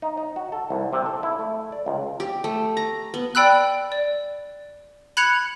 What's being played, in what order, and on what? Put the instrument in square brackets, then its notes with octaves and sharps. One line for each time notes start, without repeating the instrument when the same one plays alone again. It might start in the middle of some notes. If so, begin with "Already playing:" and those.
[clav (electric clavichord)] D#4
D#4
F#4
A4
C2
C3
A4
E4
A3
D5
C#2
[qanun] G4
A3
A#5
B3
[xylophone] D5 G5 B5 E6 F#6
D5
B5 F#6 G#6 C#7 F7